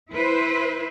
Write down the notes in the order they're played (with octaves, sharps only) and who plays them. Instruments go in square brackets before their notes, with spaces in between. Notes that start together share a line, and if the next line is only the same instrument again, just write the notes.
[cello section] E4 B4 C5